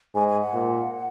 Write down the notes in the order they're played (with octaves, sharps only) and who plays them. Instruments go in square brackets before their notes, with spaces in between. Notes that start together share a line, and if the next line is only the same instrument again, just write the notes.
[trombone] G#2 [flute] G#5
[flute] G#5
F#5
[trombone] A#2